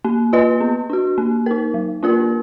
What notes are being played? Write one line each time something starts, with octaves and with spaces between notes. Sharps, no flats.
A#3
F4 B4 D#5
B3
D4 F#4
A#3
D#4 A#4
F#3
A#3 D4 F4 A#4